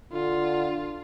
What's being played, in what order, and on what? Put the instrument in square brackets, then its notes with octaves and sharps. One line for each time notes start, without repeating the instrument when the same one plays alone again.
[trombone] D3 [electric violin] F4